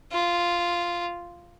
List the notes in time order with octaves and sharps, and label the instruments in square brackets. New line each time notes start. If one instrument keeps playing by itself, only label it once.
[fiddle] F4